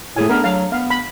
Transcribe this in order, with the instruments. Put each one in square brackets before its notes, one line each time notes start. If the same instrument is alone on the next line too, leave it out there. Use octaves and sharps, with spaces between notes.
[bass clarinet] A2 [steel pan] A3 G#4 G#5
[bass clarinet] B3 [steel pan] D4 A#4
[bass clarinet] F#3 [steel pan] F5
[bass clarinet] B3 [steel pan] F5
[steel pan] B5